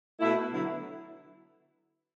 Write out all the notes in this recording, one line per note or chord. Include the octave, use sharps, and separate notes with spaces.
B2 A3 E4
D3 F#3 B3 E4